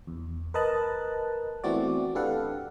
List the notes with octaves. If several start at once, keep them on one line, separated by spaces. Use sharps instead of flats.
E2
A#4 B4 D#5 A5 F#6
E3 A3 B3 C4 F#4 D5
D4 G4 A4 B4 F5 F#5